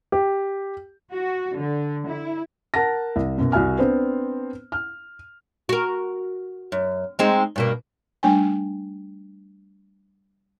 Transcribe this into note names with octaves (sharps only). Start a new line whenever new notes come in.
G4
F#4
D3
E4
A#4 F#5 A5 A#6
C2
F#2 B2
C2 F#4 E5 G#5 F6
B3 C4 D4 C5
F6
F#4 A#4
F#2
G#3 C4 D#4
G2 B2 A#3
G3 A3 D4 G5 G#5